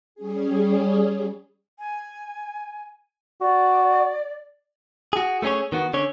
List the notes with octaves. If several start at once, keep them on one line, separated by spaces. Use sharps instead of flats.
G3 C#4 G#4
G#5
F#4 D5
F#4 G#4
A3 B3 C#4 G#4 C#5
D#3 B3 F#4
D3 C#4 C#5